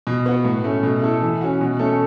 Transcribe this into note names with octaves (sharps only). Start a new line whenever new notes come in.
B2
B3 F#4
A2
A3 C#4
B2
A3 E4 A4
E3
C#4 F#4
B2
A3 C#4 A4